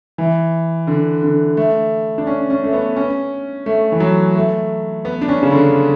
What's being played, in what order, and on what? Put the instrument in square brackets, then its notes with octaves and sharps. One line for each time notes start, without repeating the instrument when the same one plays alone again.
[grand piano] E3
D3
D3
A3
D4
C#4
C#4
A3
B3
C#4
A3
E3
F#3
A3
B3
D4
C#4
C#3
D3